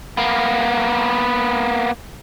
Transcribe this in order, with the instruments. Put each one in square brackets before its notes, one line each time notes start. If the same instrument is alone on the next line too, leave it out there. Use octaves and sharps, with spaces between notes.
[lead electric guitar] A#3 B3